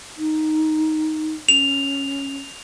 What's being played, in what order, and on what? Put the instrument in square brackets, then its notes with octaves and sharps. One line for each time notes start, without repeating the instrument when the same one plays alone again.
[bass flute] D#4
[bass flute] C#4 [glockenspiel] F7